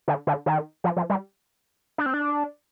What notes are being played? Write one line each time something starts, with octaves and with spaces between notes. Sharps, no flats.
D3
D3
D#3
F3
F3
G3
D4
C4
D4